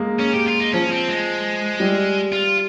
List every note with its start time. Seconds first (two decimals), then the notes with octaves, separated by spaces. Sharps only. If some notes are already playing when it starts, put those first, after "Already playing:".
Already playing: G#3 A#3
0.20 C#4
0.34 G4
0.48 F4
0.60 D#4
0.73 F3 C#4
0.92 C4
1.08 G#3
1.80 G3
2.32 F4